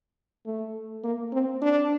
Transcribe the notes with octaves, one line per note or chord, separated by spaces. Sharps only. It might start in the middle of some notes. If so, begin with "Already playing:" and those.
A3
A#3
C4
D4